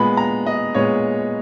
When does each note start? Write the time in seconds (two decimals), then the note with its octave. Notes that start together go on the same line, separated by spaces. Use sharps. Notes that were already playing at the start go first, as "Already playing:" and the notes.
Already playing: A#2 G#3 B3 B5
0.17 A#5
0.46 D#5
0.75 A#2 G#3 B3 C#5